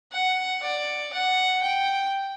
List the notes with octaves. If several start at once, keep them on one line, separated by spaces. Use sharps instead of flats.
F#5
D5
F#5
G5